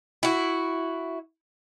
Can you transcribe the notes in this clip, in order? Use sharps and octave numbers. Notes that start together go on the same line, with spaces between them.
E4 F#4